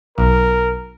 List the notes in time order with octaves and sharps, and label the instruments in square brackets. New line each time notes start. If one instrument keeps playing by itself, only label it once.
[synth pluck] B1 [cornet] A#4